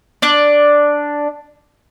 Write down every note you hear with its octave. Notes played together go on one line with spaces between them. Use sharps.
D4 D5